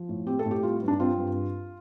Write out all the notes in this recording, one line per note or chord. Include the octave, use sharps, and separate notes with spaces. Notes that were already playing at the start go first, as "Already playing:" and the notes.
Already playing: F3
A2
C4 G4
A4
A2
G4
G3 F4
G2
D4
C4 F4
G2